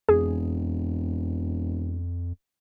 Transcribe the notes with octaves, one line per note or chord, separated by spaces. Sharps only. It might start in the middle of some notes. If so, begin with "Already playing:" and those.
E1 F2 G#4